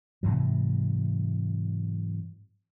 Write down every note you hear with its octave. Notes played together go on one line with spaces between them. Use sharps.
G#2 C3 E3 F#3